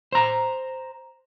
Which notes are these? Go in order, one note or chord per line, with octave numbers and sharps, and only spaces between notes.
C5 A#5